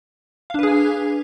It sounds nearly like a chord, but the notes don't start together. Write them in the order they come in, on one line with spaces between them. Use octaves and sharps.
F5 D4 B4 G#4 G#5